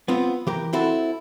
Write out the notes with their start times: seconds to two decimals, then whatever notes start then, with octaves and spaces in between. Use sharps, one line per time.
0.08 B3 C4 F4
0.47 E3 G4 A#4
0.73 C4 E4 F#4 A4